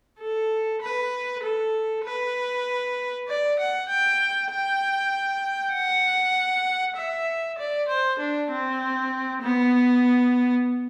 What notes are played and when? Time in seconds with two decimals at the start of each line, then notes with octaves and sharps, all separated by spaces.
0.20 A4
0.82 B4
1.43 A4
2.04 B4
3.28 D5
3.59 F#5
3.89 G5
4.51 G5
5.74 F#5
6.96 E5
7.58 D5
7.88 C5
8.19 D4
8.50 C4
9.42 B3